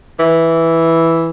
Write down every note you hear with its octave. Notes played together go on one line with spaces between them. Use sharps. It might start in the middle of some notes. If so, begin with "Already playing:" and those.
E3